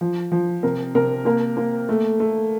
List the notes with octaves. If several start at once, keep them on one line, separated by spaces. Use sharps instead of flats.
F3
F3
C3 A#4
C3 A#4
A#3 A#4
A#3
A3
A3